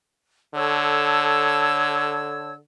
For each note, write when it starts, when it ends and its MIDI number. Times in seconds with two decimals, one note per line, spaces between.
0.54 2.59 50
0.54 2.52 69
0.54 2.52 73
0.54 2.52 88